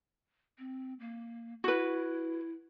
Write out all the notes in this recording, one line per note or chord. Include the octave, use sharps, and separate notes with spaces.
C4
A#3
E4 F#4 B4